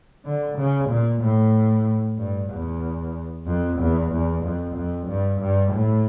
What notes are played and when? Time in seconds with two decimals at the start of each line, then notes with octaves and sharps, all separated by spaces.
0.25 D3
0.58 C#3
0.90 A#2
1.21 A2
2.18 G2
2.51 E2
3.47 F2
3.80 E2
4.12 E2
4.44 F2
4.75 F2
5.08 G2
5.40 G2
5.72 A2